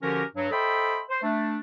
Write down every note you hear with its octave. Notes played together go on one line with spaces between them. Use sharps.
D3 F3 C#4 F#4 G4 A#4
G2 F#3
A4 C5 D#5 E5 G5 B5
C5
A3 D4